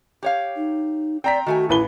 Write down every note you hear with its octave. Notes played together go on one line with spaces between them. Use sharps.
G4 C#5 F5
D#4
C4 D5 G5 A#5 B6
D#3 A3 F#4 G#5
A1 E4 B4 G7